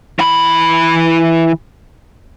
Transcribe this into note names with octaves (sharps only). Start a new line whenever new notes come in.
E3 B5